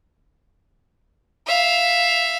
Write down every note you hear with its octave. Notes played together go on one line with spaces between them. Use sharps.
E5 F5